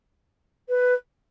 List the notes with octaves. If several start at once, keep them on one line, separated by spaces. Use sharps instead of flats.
B4